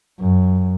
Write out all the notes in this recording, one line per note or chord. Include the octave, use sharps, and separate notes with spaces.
F#2